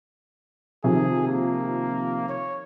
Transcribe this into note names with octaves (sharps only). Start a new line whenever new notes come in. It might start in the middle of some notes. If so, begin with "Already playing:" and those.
C3 D#3 F3 G#4
A#3
C#5